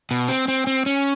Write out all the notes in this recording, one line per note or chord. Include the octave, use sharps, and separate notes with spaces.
B2
C4
C4
C4
C#4